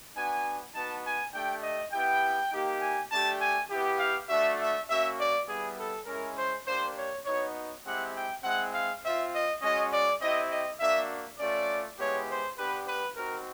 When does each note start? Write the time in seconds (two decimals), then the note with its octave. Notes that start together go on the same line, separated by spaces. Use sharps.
0.15 B3 D4 F#4 G#5
0.74 B3 D#4 F#4 A5
1.04 G#5
1.33 A3 D4 G4 G5
1.62 D#5
1.92 B3 E4 G4 G5
2.52 A#3 D#4 G4
2.81 G#5
3.11 A3 D4 G4 A5
3.40 G#5
3.70 B3 E4 G4
3.99 F5
4.29 A3 D4 F#4 E5
4.59 E5
4.88 A#3 C#4 F#4 E5
5.18 D5
5.47 G3 B3 E4 G#4
5.77 A4
6.06 G#3 C#4 E4 A#4
6.36 C5
6.66 A#3 D4 G4 C5
6.96 C#5
7.25 B3 D#4 F#4 C#5
7.84 G#3 C4 E4 G4 F#5
8.14 G5
8.43 G#3 C4 E4 F#5
8.73 F5
9.02 C4 F4 E5
9.32 D#5
9.62 G#3 C#4 F#4 D#5
9.91 D5
10.21 C4 E4 G4 D#5
10.50 D#5
10.80 A#3 D4 F#4 E5
11.39 A3 C#4 F4 D5
11.98 G#3 B3 E4 G4 C#5
12.28 C5
12.57 B3 D4 G4 B4
12.87 B4
13.16 C4 D#4 F#4 A#4